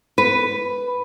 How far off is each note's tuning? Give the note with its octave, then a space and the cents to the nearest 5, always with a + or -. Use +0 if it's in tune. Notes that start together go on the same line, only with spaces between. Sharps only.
B4 +5